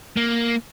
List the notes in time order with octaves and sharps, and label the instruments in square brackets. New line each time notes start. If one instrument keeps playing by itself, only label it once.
[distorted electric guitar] A#3